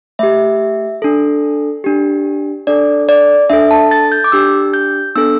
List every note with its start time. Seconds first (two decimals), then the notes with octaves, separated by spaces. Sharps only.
0.19 A3 G4 E5
1.02 D4 A4
1.84 D4 G4
2.67 D4 A4 D5
3.09 D5
3.50 D4 A4 E5
3.71 A5
3.91 A6
4.12 G6
4.24 D6
4.32 D4 G4 E6
4.74 G6
5.16 B3 D4 A4 E6